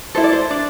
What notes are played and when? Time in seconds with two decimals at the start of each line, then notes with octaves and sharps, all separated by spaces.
0.15 E4 A4 C5
0.24 D5
0.32 C5
0.50 D4 D5